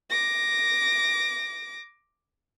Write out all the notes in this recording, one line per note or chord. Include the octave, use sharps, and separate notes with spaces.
D6 A#6